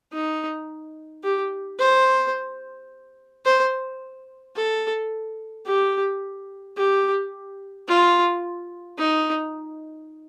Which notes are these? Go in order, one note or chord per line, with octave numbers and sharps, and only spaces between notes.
D#4
G4
C5
C5
A4
G4
G4
F4
D#4